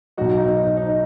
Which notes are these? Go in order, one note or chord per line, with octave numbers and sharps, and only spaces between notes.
B1 B2 F#3 D#4 F#4
D#4
D#4
D#4